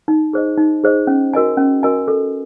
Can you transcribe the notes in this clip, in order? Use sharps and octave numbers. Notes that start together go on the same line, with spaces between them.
D#4
G#4 C5 D#5
D#4
G#4 C5 D#5
C#4
F#4 A#4 D#5 G#5
C#4
F#4 A#4 D#5 G#5
A4